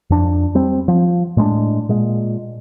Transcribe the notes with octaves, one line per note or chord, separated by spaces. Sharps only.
F2 D4
G3 C4
F3
A2 G#3 B3 D4
A#2 G#3